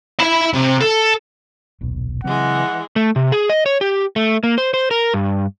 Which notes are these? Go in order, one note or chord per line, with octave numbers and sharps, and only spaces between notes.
E5 B5
C3
A4
D#1 B1 B2
C#3 E3 F#3 G#3 C4 F#5
A3
C3
G#4
D#5
C#5
G4
A3
A#3
C5
C5
A#4
G2